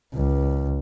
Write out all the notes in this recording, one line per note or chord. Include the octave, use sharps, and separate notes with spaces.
C#2